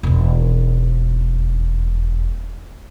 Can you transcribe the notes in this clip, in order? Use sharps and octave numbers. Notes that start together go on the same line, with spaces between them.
E1 D#2